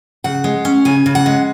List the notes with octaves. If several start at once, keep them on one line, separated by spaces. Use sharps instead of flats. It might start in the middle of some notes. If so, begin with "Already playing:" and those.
C#3 F#5
G#3
C#4
C#3 G#5
C#3
F#5
G#3